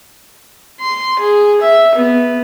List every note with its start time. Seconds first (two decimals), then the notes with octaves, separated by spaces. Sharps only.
0.81 C6
1.19 G#4
1.61 E5
1.95 B3